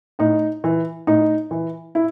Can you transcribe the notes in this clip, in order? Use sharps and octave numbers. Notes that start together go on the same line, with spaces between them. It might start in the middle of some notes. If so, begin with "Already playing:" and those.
A2 D#4
E3
A2 D#4
E3
E4